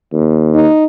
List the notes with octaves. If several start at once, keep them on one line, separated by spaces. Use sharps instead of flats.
D#2
D#4